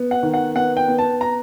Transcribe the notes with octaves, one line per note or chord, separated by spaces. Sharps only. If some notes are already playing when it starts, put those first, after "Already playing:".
Already playing: B3
F#5
D#3
F#5
B3 F#5
G5
B3
A5
A#5